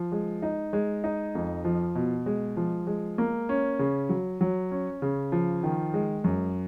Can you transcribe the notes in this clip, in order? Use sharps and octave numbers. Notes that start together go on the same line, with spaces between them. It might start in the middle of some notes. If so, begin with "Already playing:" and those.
Already playing: F3
G#3
D#4
G#3
D#4
F2
F3
B2
G#3
F3
G#3
A#3
C#4
C#3
F#3
F#3
C#4
C#3
F3
D#3
G#3
F#2